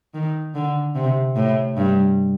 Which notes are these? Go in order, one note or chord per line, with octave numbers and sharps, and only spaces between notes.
D#3
D3
C3
A2
G2